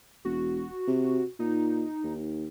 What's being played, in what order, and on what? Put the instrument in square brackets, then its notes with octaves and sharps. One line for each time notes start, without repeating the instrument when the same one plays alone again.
[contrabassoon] E1 [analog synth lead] F#4
[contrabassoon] C3
[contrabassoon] A#2 [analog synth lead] D#4
[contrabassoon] D#2